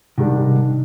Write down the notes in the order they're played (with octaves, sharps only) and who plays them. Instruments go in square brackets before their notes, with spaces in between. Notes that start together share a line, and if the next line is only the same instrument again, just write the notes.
[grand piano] G#2 D#3 G3 D4 [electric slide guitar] C3